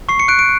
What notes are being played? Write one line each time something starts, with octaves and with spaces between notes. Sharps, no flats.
C#6 C7
C#7
F#6 D7
D7